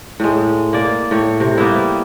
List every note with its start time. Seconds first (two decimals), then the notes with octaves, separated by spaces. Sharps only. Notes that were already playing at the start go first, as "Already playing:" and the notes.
0.20 A2 G#3
0.73 A#3 D5
1.11 A2 C#5
1.40 C3
1.58 G3 A#3 B3 E4